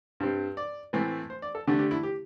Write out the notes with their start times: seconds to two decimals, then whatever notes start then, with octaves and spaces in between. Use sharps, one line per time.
0.20 G2 G3 C4
0.57 D5
0.93 A2 E3 A3 C4
1.30 C5
1.42 D5
1.55 A4
1.67 D3 A3 D4 G4
1.79 G4
1.91 E4
2.03 G4